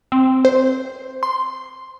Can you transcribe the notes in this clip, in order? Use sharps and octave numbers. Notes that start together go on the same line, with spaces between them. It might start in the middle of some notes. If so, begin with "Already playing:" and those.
C4
C5
C6